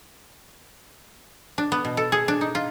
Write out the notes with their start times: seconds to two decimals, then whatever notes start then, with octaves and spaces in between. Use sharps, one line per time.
1.58 D4
1.72 B3
1.85 B2
1.97 A4
2.12 G#4
2.28 D4
2.41 D#4
2.55 F4